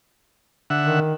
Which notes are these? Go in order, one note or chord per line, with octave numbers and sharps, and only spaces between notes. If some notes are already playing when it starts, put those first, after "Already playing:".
D3 E5 F#5
D#3